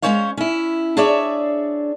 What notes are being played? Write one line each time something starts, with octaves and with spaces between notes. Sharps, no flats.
G#3 B3 C#4 C5 C#5 F5
C#4 E4
D4 G#4 C#5 D5 E5